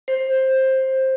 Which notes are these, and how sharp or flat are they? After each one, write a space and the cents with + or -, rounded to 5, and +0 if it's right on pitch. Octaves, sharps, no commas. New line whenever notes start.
C5 +15